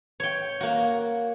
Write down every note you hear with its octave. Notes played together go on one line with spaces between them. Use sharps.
C#5 G5
A#3 F#4